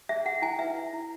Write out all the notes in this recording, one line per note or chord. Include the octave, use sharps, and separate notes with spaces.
G#4 E5
G#4 F#5
E4 G#5
B4 E5
E4
E4